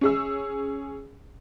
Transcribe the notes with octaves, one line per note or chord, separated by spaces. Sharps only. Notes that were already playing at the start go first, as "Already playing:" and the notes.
C#4 G#4 E6